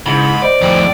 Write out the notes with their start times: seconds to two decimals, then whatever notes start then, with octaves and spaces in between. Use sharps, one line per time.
0.06 G#2 C#3 E4 B5
0.42 C5 D5 D#5
0.61 F2 A2 D5